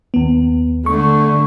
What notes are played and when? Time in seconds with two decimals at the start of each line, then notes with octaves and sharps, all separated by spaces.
0.14 D#2 B3
0.86 D3 A3 C#6